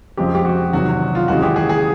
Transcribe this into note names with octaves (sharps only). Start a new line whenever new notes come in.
F2 C#3 F3 G#3 C4 G4
G4
F#4
E2 C3 D#3 F#3 F#4
F4
D#2 C#3 E3 G#3 F#4
G4
G#4
G#4